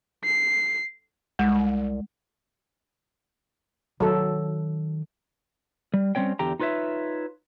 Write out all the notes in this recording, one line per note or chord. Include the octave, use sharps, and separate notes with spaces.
C7
C2 G#3
D#3 F#3 A4
G3
G3 C4 C#4 C#5 G5
E2 D3 G4 G5 A#5
D#4 F4 B4 C#5 E5